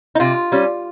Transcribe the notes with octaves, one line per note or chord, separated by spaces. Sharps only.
D#4
C3 F4
G3 C#4